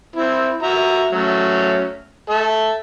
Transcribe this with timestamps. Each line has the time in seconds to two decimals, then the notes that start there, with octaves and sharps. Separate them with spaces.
0.16 C4 E4
0.63 F#4 E5 A#5
1.12 F#3 A3 C#4
2.30 A4 E5